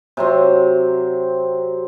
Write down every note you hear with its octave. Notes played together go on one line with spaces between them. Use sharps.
C3 F#3 C4